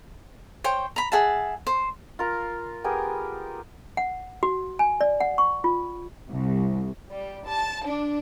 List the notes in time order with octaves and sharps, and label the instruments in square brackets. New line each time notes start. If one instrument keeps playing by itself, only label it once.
[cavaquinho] C5 C#5 G5
A#5 B5
G#4 E5 F#5 A5
C5
[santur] F4 A#4
B3 G4 G#4 A#4
[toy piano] F#5
F#4
G#5
D5
F#5
C#6
F4
[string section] C2
G3
A5
D4